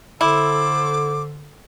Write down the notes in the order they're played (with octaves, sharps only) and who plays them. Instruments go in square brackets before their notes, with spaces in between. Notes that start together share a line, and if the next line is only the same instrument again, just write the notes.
[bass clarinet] D3 [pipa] E4 [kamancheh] A4 C5 [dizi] D6